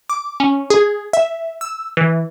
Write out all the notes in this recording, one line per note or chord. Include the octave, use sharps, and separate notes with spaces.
D6
C#4
G#4
E5
E6
E3